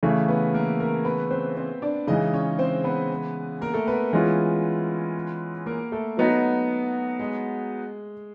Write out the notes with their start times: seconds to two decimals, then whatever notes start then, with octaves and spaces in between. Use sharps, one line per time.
0.03 C#3 E3 A3 C#4 C#5
0.28 B3 B4
0.54 A#3 A#4
0.80 A#3 A#4
1.05 B3 B4
1.30 C4 C5
1.56 C4 C5
1.82 D4 D5
2.07 C#3 E3 G#3 D#4 D#5
2.34 C#4 C#5
2.59 C4 C5
2.84 B3 B4
3.61 A#3 A#4
3.74 A3 A4
3.88 B3 B4
4.13 E3 G#3 B3 C#4 F4 B4
5.66 A#3 A#4
5.92 A3 A4
6.17 F#3 B3 D#4 F#4
7.19 G#3 G#4